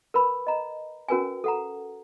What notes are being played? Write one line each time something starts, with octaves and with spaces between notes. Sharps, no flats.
A#4 B4 B5
D#5 A#5
C#4 F#4 A#4 B4 G5 G#5
A4 F#5 A#5